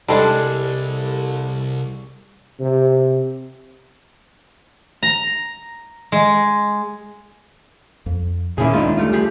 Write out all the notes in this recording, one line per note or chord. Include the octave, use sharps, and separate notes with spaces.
C2 G3 G#3 D4 A4
C3
A#5
G#3
F2
A#2 D#3 A#3 C#4 E4 G#4
D2 G#3 D4 D#4 F4
G3 A3 F4
G4 G#4